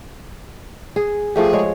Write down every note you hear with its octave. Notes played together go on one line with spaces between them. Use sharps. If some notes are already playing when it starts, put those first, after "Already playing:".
G#4
F3 A3 G4 G#4
G#3 C#5